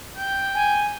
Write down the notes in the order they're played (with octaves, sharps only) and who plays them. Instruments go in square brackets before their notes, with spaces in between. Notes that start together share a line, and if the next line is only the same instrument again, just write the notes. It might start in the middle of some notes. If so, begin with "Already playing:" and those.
[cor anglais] G5
[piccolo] G#5